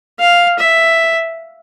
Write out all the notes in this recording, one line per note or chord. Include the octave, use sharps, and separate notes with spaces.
F5
E5